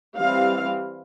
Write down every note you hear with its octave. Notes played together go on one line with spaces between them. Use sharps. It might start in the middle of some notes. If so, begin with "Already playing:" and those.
E3 G3 C4 F5